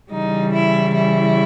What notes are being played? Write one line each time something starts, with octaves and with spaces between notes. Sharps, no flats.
C#3 E3 G3 D#4
E4
E4